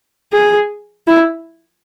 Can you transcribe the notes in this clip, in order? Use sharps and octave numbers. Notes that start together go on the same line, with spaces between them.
G#4
E4